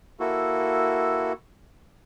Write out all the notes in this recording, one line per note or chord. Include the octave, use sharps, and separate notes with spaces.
A#3 E4 F#4 A4